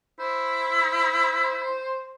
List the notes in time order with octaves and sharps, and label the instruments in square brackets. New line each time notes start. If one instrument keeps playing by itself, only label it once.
[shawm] E4 [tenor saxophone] C5